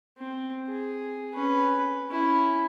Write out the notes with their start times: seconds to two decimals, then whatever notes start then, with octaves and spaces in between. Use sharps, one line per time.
0.18 C4
0.68 G#4
1.34 C#4 B4
2.09 C#4 E4